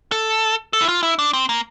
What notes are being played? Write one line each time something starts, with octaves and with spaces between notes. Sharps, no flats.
A4
A4
E4
F4
E4
D4
C4
A#3